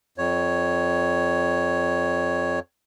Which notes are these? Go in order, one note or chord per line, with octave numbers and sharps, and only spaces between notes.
F2 C#5